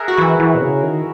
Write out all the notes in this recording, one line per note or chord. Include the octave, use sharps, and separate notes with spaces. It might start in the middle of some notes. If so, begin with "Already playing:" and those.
Already playing: G#4 A#4 E5 F#5
F#4
E3 E4
E3
B2
C#3
D#3